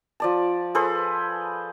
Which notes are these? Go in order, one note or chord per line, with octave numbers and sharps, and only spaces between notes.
F3 D5 A5
G#4 A4 B4 C5